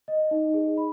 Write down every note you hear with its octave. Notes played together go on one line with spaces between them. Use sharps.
D#5
D#4
G#4
B5